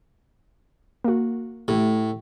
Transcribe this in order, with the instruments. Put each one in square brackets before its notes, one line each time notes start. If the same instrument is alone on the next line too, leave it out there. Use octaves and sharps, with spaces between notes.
[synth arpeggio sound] A#3 F#4
[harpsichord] A2 [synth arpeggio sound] A3 G4